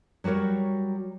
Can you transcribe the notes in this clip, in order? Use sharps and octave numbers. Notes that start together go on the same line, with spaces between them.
F#3 G3 F#4 A#4 C#5